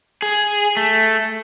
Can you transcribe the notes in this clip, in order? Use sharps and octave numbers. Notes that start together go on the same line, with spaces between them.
G#4
A3